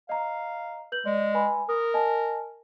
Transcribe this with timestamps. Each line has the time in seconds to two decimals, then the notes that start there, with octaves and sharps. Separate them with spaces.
0.09 D#5 F5 A#5
0.92 B4 G6 F#7
1.06 G#3 D5
1.34 B4 G#5 B5
1.69 A#4 D#6
1.94 D#5 G#5 A5